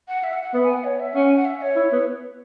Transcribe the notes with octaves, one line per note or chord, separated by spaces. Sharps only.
F#5
E5
F#5
F#5
B3 E5
G#5
F#5
C#5
E5
C#4 F#5
G#5
F#5
E5
C#5
E4
B3